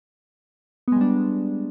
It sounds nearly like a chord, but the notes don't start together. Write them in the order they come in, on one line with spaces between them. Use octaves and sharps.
B3 G#3 G3 D4